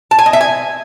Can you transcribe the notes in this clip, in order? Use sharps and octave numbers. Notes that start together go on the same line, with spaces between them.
A5
G#5
D#5
E5
G#5